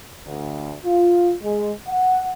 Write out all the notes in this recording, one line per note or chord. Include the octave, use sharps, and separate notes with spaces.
D2
F4
G#3
F#5